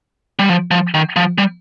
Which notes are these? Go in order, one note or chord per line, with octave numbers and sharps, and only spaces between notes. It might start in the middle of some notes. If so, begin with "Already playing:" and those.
G3
F3
F3
D#3
F3
G3